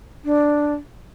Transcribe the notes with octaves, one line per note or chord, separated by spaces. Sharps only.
D4